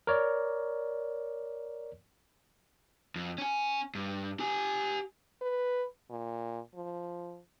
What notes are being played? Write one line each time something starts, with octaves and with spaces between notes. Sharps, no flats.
A#4 C#5 D5
F2
C#4 G#5
G2
G4 G#5
B4
A#2
F3